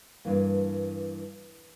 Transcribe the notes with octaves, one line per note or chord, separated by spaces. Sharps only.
G2 E3 A#3